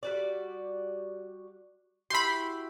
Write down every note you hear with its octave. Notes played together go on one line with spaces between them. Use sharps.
G3 F#4 D5
E4 F#4 G4 B5 C6